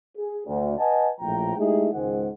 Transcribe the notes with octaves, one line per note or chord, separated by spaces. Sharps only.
G#4
D2
B4 D#5 F#5 G#5 A5
A#1 A2 F3 G5 A#5
G#3 A3 D#4 E4 G4 G#4
C#2 G#2 D#3 G#4 C5 F#5